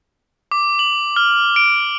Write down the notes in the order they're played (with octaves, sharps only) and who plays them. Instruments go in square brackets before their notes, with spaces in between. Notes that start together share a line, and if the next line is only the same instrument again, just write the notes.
[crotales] D6
F#7
F6
D7